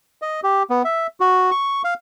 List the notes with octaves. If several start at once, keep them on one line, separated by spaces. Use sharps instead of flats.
D#5
G4
B3
E5
F#4
C#6
F5